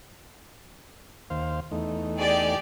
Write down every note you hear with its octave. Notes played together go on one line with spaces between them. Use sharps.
D#2 C5 F5
E2 A3 D#4
G4 G#4 D5